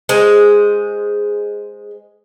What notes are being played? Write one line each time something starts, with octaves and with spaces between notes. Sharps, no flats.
G#3 C5